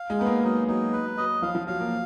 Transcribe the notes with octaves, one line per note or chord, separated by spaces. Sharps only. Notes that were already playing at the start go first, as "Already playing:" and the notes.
Already playing: F5
G#3
B3 D#4
A#3
F#3 D#4
F#3 D#4
B4
F#3 D#5
F3 F5
F3
F#3 F5
A#3